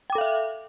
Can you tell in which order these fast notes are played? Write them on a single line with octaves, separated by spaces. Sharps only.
G5 D6 A4 F5 E5